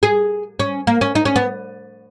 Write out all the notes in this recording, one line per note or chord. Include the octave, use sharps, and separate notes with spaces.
G#4
C#4
A#3
C#4
D#4
C#4
B3